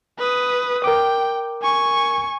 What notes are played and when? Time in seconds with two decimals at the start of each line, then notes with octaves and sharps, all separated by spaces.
0.19 B4 D#6
0.84 A#4 G5 D6
1.62 G#5 C#6